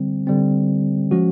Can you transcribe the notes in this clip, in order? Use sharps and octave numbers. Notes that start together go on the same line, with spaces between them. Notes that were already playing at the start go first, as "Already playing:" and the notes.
Already playing: D3 G3 C4
D3 G3 C4
F3 G#3 C#4 F#4